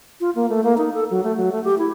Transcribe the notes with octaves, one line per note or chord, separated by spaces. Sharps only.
F4
A#3
A3
A#3
D#4
A4
F#3
A3
F#3
A3
G4
E4